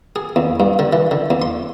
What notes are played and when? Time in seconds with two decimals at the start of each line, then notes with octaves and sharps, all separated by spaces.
0.16 G#4
0.36 E2
0.60 G2
0.79 D3
0.93 E3
1.11 D3
1.30 E2
1.42 C6